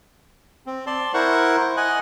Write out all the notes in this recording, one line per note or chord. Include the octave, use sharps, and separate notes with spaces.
C4
D5 A5 C6
E4 A#4 C5 F#5 C#6
D#5 F#5 G#5 F#6